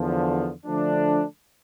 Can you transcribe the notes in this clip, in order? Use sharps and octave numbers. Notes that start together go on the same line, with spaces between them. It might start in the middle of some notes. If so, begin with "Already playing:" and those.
Already playing: E2 D3 F3
D3 F3 A3 D4